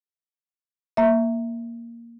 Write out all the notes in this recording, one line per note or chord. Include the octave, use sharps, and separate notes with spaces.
A#3 E5